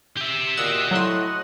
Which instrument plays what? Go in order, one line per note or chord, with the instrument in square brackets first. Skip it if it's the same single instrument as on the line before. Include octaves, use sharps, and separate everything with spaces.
[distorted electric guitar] G4 E5
[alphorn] A#2 [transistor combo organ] F#4 D#5 F#5 [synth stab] E6
[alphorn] A2 [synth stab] F#3 C6